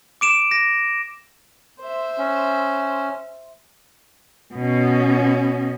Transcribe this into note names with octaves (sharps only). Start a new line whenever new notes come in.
D6 D7 E7
A#6
C5 E5
C#4
B2 C#4